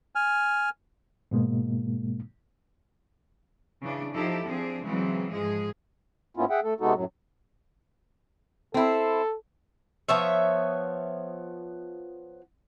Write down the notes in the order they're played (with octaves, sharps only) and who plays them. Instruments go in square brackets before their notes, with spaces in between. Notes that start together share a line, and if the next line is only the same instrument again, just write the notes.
[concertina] G#5 F6
[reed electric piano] G#2 B2 G#3 A#3
[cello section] C#3 E3 D4
F3 D#4 E4 G4 A4
F3 C4 D4 G#4
C#3 E3 F#3 G#3 C4
G#2 F3 G#3 G#4
[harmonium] G#2 A#3 B3 C#4 E4 F4
G#4 E5 F#5 G5
A3 A4
C3 G#3 B3 D#4 F#4 A4
F#2 A2 F#3
[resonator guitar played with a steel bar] C4 E4 [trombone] A4
[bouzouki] F3 B3 C#5 E5